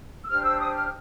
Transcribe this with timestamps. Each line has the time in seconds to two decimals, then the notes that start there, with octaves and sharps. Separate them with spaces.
0.24 E6
0.28 D4 G4 C5 F6
0.43 E6
0.58 D#6
0.74 F6